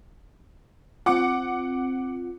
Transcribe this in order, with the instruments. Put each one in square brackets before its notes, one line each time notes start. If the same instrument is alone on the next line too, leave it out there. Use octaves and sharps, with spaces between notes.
[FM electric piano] C4 F4 [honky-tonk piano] F#5 D6 C#7